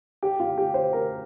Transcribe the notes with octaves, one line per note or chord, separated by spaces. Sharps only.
G4
F4
G4
C5
A#4